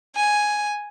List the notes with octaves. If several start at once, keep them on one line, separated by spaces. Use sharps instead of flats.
G#5